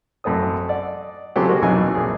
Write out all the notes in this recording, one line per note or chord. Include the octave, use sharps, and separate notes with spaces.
A1 F#2 A3 C4 D#6
D5 D#5 F#5
C#3 F#3 C4 F4 G4 A4
G#3 A#3 F#4
B1 E2 C3 F#3 D#4 G#5
A#1 G#4